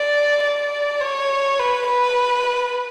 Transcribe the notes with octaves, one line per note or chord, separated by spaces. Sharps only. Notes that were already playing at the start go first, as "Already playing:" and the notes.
Already playing: D5
D5
C#5
B4
B4